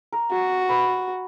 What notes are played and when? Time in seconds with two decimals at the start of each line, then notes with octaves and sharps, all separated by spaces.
0.12 A#4
0.31 F#4
0.69 B4